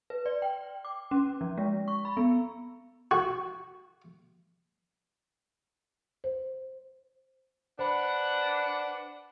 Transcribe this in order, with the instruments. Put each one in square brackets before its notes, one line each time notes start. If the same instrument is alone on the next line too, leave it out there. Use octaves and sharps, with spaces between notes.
[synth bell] B4
D5
G5
D6
C#4
F3
G#3
C#6
B5
B3
[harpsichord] F#4
[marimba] C5
[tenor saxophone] D4 [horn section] B4 F#5 [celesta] C5 B5